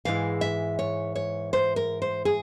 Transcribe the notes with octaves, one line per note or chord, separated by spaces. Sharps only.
G#2 E3 G#3 E4 F5
E5
C#5
C#5
C5
A#4
C5
G#4